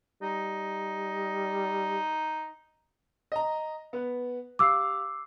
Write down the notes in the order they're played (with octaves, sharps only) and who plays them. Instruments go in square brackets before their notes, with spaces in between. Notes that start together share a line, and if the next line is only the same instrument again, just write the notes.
[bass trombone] G3 [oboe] D#4
[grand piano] D#5 A#5
B3 B4
[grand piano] G4 F5 C7 [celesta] D6 E6